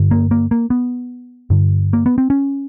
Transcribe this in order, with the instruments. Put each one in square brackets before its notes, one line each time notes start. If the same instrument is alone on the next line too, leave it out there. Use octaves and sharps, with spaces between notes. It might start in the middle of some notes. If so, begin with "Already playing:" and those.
Already playing: [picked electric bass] G2 D3
A#3
A#3
A#3
B3
G2 D3
A#3
B3
C4
C#4